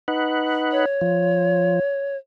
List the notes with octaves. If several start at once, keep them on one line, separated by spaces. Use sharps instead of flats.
D#4 B4 F#5
C#5
F3